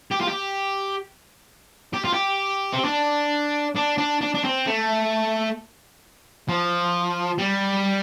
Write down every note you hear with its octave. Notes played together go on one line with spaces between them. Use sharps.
G4
F4
G4
G4
F4
G4
C4
D4
D4
D4
D4
D4
C4
A3
F3
G3